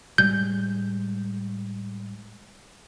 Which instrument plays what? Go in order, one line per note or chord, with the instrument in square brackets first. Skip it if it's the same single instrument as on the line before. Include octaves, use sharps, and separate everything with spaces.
[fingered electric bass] A2 G3 G#3 [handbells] G6